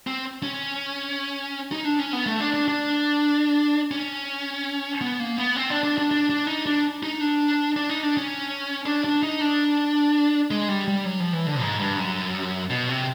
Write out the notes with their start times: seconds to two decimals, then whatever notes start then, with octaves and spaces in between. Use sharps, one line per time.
0.07 C4
0.43 C#4
1.72 D#4
1.85 D4
1.99 C#4
2.13 B3
2.26 A3
2.40 D4
2.54 D4
2.68 D4
3.91 C#4
5.01 B3
5.20 A#3
5.38 B3
5.56 C4
5.70 D4
5.83 D4
5.98 D4
6.11 D4
6.30 D4
6.47 D#4
6.66 D4
7.03 D#4
7.21 D4
7.76 D4
7.89 D#4
8.03 D4
8.17 C#4
8.86 D4
9.04 D4
9.23 D#4
9.41 D4
10.51 G#3
10.68 G3
10.88 G3
11.05 F#3
11.20 F3
11.33 E3
11.47 D3
11.61 G#2
11.79 G2
11.98 F#2
12.70 B2
12.89 C3